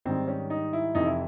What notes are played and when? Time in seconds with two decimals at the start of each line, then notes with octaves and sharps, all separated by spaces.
0.05 G#2 D#3 G3 C4
0.28 C#4
0.50 D#4
0.73 E4
0.95 F2 C3 E3 D#4
1.06 E4